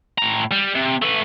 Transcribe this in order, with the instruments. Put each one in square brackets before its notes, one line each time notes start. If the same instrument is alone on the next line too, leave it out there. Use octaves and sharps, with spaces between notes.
[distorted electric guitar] A2 A#5
G3
C3
A3 B4